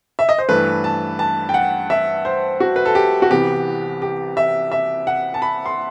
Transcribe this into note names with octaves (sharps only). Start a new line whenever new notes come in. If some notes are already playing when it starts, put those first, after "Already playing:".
E5
D#5
C5
G2 E3 A3 B4
A5
A5
G5
F#5
E5
C5
F#4
B4
A4
G4
F#4
C2 C3 E3 B3 G4
G4
E5
E5
F#5
A5
B5
C6